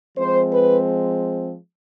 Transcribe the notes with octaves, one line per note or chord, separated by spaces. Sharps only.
F3 G#3 C4 C5
B4